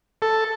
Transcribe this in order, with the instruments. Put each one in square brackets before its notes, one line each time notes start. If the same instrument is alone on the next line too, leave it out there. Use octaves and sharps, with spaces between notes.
[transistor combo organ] A4